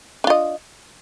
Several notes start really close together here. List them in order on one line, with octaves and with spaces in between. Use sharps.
D4 F4 D#5